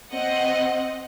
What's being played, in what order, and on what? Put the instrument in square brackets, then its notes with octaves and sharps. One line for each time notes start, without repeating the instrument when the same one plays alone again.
[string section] C4 D#5 F#5